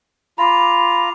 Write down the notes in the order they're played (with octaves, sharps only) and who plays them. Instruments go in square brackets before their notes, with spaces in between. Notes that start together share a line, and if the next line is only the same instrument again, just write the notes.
[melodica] F4 A#5 [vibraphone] B5 D6